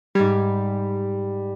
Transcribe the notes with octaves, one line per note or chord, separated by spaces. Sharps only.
G#2 G3 G#6